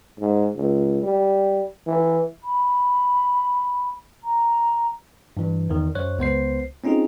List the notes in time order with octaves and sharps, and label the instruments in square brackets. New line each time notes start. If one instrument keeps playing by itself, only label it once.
[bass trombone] G#2
C#2
G3
E3
[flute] B5
A#5
[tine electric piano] G2 E3
E2 D#3
F#2 C5 C#5 F#6
C#2 B3 C5 C7
C4 C#4 D#4 F4 G#4